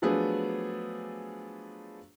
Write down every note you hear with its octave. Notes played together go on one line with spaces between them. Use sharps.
F3 F#3 A3 B3 D4 G#4